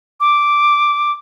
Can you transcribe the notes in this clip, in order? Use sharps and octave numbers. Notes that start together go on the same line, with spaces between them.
D6